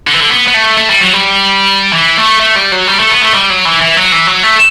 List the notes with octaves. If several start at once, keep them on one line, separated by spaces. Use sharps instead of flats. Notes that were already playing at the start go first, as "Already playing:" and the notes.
D3
E3
D3
B3
B3
A3
A3
G3
F#3
G3
E3
A3
A3
G3
F#3
G3
A3
B3
A3
G3
F#3
E3
E3
F#3
E3
F#3
A3